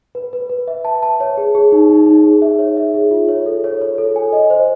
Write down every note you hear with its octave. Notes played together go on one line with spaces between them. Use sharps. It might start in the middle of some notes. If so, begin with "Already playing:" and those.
B4
B4
B4
E5
A5
A5
C#5
G#4
G#4
D#4
D#4
D#4
G#4
E5
C#5
E5
G#4
F4
C#5
A4
C#5
C#5
A4
G#5
D#5
C5